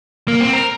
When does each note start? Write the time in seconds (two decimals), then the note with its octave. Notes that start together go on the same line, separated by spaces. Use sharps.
0.28 A#3
0.41 C4
0.53 A#4